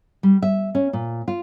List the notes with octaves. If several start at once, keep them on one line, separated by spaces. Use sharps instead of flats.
G3
E5
C#4
A#2
F4